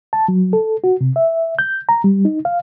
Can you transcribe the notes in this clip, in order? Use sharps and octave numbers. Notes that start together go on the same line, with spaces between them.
A5
F#3
A4
F#4
C3
E5
G6
A#5
G3
D#4
F5